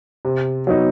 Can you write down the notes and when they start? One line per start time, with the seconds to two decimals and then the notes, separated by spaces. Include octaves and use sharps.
0.25 C3
0.67 F#3 B3 D#4